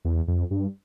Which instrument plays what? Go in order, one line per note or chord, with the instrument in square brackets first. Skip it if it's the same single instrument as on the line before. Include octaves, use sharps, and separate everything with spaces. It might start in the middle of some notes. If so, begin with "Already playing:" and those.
[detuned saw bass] E2
F2
G2